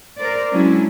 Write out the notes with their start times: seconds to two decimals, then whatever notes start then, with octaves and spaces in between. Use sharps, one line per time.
0.17 A#4 C5 D5
0.52 F#3 G#3 C#4 D4 E4